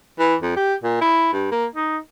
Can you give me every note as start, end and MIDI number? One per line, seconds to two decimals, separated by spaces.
0.19 0.35 52
0.41 0.56 41
0.57 0.74 67
0.83 0.99 46
1.01 1.32 64
1.33 1.51 43
1.51 1.66 58
1.75 1.97 63